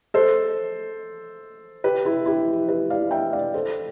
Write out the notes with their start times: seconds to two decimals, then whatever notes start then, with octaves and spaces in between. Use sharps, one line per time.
0.14 A4 C5
1.84 G4 B4
2.05 E4 G4
2.26 E4 G4
2.68 G4 B4
2.90 D5 F5
3.11 E5 G5
3.33 D5 F5
3.54 A4 C5